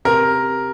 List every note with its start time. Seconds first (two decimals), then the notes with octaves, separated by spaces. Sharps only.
0.05 C3 A#4